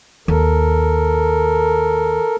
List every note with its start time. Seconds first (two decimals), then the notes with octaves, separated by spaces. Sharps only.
0.28 D#2 A4 A#4